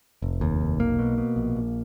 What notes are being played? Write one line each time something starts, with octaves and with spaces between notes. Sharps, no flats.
F1
D#2
F1
B1 A#3
B2
B2
A#1
A#1